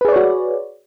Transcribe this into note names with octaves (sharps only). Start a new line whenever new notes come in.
F#4 G#4 B4 C#5 D5